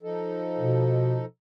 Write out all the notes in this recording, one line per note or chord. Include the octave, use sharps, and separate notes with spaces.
F3 D#4 A4
B2